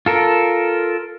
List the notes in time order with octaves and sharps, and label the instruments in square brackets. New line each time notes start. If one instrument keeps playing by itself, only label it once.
[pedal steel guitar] F4 A4 A#4